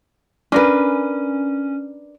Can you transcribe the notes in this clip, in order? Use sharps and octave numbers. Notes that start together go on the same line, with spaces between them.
C#4 D4 A#4 B4